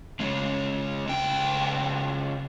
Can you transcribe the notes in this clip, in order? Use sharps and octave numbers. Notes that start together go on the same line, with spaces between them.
C#3 G#3
C#2 G5